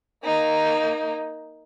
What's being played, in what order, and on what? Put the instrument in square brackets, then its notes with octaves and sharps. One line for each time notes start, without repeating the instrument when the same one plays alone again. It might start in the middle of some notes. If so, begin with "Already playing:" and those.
[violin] A#3 D#4